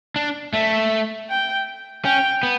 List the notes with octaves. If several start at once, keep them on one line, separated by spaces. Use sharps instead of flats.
D4
A3 E5
G5
C#4 G5
B3